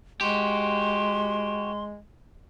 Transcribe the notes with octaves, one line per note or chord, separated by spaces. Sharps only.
G#3 F#4 G4 C6